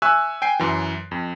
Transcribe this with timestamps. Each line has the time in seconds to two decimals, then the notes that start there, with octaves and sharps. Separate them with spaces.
0.02 E5 G#5 C#6 E6 F#6
0.42 G5 G#5 C7
0.59 F#2 E3
1.11 F2